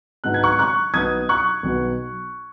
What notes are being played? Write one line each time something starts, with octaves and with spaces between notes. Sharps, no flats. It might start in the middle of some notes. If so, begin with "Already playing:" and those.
G#2 F#3 B3 D#4 F#6
G#6
C#6 F#6
C#6 F#6
B1 B2 B3 D#4 D#6 G#6
C#6 F#6
B1 B2 B3